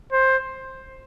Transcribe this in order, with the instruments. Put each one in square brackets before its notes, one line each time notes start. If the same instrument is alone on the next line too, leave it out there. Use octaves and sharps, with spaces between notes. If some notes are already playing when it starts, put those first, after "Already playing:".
[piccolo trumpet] C5